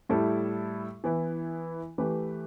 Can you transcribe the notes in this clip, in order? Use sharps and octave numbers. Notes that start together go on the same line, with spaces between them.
A2 G3 E4 A4
E3 B3 E4
E3 A3 G4 B4